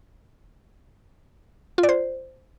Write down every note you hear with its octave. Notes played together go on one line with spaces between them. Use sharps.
F4
D5
C5